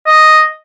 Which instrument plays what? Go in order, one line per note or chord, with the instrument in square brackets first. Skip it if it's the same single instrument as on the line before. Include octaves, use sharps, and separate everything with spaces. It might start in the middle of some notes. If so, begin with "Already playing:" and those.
[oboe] D#5